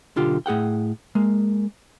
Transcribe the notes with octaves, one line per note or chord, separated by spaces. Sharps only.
B1 D3 F4 G4
A2 G#4 F#5 G5
G#3 A#3